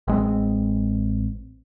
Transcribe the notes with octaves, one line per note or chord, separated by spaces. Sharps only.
A1 G#3 C4